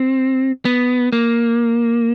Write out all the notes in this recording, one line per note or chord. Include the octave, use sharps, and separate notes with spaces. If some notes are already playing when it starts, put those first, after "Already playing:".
Already playing: C4
B3
A#3